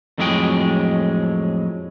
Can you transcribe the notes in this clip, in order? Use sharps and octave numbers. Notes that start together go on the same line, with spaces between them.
F2 A2 F#3 G#3 G#4 G5